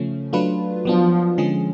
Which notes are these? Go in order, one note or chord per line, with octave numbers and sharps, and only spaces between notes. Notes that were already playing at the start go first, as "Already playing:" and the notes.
Already playing: C#3 F3 A3 C#4
F#3 A3 D4 F4 B4
F3 F#3 B3 D4 F4
D3 F3 G#3 C#4 G#4